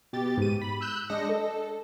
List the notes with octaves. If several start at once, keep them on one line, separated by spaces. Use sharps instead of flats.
B2 G4 A6
G#2 D#7
B5
E6 F#6 G6 E7
G#3 D4 D#5 A#6 C#7
A4